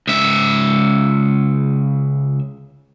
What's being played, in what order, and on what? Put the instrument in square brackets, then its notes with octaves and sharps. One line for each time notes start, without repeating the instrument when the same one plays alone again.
[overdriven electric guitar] C#2 E5